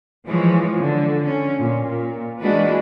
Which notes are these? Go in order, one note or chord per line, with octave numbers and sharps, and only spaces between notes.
E3 F3 G#3 C#5
D3
C#4
A#2
A#2
E3 G#3 A#3 D4 F#4 B4